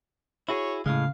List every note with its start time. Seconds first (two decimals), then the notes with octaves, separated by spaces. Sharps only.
0.49 E4 F#4 G#4 C#5
0.86 A2 C#3 G#3 F5